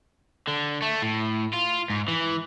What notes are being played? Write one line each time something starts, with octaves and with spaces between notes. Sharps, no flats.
D3
A3
A2
F4
G#2
E3